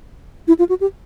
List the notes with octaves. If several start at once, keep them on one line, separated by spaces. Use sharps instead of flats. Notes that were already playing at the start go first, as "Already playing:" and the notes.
E4
F4
F#4
G4